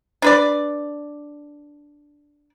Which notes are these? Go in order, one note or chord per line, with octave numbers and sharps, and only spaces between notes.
D4 B4 D5